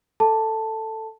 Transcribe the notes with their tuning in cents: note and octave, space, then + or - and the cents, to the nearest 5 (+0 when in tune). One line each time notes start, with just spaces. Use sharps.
A4 +10 A5 +5